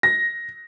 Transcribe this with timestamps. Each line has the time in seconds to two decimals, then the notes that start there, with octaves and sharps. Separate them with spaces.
0.03 A#6